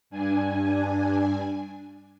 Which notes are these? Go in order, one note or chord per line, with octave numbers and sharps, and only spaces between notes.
G2 D4 G#5